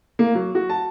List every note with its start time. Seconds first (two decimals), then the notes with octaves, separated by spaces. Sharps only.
0.19 A#3
0.35 F#3
0.55 F#4
0.70 A5